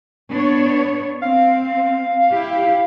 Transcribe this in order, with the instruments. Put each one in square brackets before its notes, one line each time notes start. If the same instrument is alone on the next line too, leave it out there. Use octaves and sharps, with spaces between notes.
[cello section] B3 D4 C#5
[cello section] C4 [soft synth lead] F5
[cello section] E4 G4